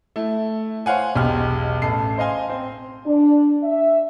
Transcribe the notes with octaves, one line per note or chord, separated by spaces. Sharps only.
A3 E4
C5 C#5 F5 F#5 G#5
E1 B1 G4 F6
A1 A4 C7
C5 D#5 F5 G#5 C6
C4
D4
E5